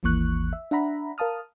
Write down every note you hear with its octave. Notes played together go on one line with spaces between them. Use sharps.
G#1 D#2 E3 A#3 C#6 F#6
E5
D4 E5 F#5 A#5 B5
A#4 F5 A5 D#6 F6